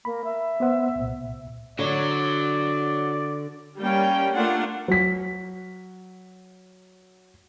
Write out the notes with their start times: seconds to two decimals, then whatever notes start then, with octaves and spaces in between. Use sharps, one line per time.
0.05 A#3 B5
0.24 E5
0.60 B3 C5 F#5
0.96 C2 A#2
1.79 D3 F#4 C#5 D5
3.78 G3 A#3 C#4 G5
4.34 A3 A#3 D4 F4 F#5
4.88 F#3 B6